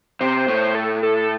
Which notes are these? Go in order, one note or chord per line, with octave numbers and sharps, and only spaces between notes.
C3 C5
A2
A4
A4
A4